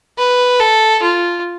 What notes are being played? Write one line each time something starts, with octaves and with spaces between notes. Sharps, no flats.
B4
A4
F4